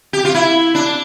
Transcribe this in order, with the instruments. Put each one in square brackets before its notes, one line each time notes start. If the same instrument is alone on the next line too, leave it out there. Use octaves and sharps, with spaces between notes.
[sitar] G4
F4
E4
D4